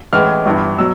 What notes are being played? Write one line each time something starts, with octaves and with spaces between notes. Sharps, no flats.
A1 A2 E3 G#3 F6
G1 G2 E3
B2 F#3 E6